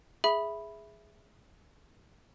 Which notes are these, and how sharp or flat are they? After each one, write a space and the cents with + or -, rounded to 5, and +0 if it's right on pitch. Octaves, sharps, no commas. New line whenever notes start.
G#4 +0 E5 +0 B5 +0